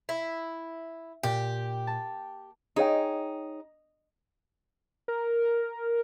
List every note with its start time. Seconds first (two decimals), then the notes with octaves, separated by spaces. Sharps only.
0.09 E4 B6
1.23 A#2 G4
1.87 A5
2.76 D#4 G#4 C#5 G5
5.08 A#4